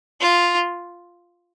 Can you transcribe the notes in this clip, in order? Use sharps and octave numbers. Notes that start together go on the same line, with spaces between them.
F4